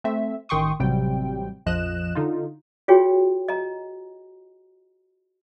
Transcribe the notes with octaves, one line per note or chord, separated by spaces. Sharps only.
A3 C4 E5
A1 D#3 G5 C6 C#6 D#6
A1 C3 F#3 G3 C4 G5
A#1 F2 F3 D#5 F#6 E7
D3 D#4 F4
F4 F#4 G#4 C#5 G5
D#5 A#5